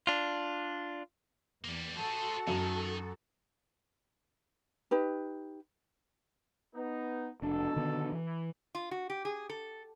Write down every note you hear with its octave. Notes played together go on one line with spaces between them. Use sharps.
D4 F4
E2 G3 A#3
F#4 G#4 A4 C5 A5
F#2 D#3
D#4 G4 B4
B3 D#4
F1 B2 D4 A4
D3 D#3 B3
E3
F4
F#4
G4
G#4
A4